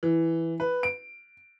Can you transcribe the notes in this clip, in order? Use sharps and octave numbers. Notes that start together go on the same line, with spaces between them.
E3
B4
D7